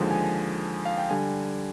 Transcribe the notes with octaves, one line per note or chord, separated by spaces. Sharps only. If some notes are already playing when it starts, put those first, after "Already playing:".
Already playing: D#2 D3 F3 G#3
G#5
F5
G5
D3 G3 G#5